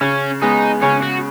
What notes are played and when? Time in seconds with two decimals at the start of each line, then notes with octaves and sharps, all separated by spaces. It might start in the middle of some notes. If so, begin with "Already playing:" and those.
0.01 C#3 C#4
0.42 G#3 B3 D#4
0.82 C#3 C#4
1.02 F#4